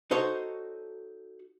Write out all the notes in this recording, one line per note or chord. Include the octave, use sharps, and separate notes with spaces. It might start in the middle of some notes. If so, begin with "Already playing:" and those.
D#4 F#4 A4 C5 C#5